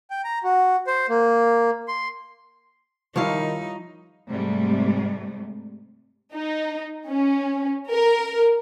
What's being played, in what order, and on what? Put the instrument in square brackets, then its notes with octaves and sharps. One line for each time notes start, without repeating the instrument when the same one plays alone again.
[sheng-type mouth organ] G5
A#5
F#4
C5
A#3
C6
[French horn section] D#3 [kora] F3 G3 E4 [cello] D#4 [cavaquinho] C#5 F5
[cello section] G#2 C3 G3 A3
[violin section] D#4
C#4
A#4